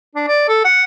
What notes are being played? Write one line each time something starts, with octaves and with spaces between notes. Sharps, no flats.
D4
D5
A4
F#5